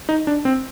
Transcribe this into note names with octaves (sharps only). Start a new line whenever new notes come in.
D#4
D4
C4